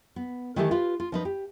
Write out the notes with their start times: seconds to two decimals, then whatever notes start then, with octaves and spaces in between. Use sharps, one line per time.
0.16 B3
0.56 D#3 E3 A3 D#4 G4 A4
0.71 F4 G4 B4 F5
1.00 F4
1.12 F3 D#4 B4
1.25 G4